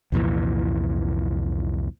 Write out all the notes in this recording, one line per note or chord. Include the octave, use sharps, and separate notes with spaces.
C2 F2 A#2 E3